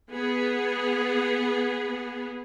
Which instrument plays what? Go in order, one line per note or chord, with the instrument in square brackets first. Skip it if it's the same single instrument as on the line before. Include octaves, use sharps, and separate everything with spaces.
[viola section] B3 G#4